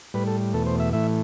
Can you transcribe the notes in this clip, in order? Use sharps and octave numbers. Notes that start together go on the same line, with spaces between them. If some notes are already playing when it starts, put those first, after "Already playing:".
A2 G3 B4
A4
E2 B2 A3 A4
C5
E5
A2 E3 A3 E5